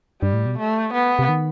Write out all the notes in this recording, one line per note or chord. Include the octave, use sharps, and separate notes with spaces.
G2 G3
A2
B2
A3
B3
C3
D#3